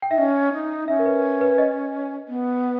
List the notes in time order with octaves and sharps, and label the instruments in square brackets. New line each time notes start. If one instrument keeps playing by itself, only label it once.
[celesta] G5
[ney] D#4 [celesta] E5
[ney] C#4 [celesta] D#5
[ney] D#4
[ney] C#4 [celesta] E5
[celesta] A#4
B4
B4
D#5
[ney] B3